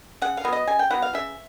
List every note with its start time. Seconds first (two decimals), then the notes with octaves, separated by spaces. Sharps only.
0.22 C#3 F#5
0.37 F5
0.44 F#3 B3 E4
0.53 D#5
0.67 C#3 G#5
0.79 G5
0.90 F#3 B3 E4 F#5
1.02 F5
1.14 C#3 E5